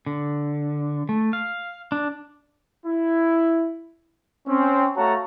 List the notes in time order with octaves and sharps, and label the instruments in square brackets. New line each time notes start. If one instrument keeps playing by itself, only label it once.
[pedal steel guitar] D3
A3
F5
D4
[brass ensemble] E4
[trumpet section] C4 C#4
A3 F#4 C#5 F5 A5 A#5